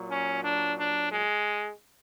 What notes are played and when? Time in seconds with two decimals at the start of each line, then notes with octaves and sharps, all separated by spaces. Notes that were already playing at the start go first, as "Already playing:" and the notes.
Already playing: A#2 F#3
0.10 C#4
0.44 D4
0.77 D4
1.11 G#3